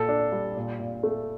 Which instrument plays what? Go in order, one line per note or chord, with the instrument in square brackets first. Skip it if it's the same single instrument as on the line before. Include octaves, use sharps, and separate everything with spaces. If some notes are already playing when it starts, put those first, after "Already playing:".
Already playing: [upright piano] A#2 A4
D4
G3
A#2
A#2
A3